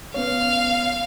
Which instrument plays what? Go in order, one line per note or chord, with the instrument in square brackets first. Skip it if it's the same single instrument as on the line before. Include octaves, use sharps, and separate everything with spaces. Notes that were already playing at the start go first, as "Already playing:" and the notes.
[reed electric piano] B3 C#4 C#5 [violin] F5